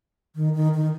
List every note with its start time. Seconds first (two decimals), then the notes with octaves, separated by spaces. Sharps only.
0.35 D#3
0.54 D#3
0.74 D#3